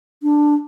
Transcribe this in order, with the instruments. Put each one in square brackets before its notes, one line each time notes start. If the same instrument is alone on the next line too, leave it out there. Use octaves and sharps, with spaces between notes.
[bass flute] D4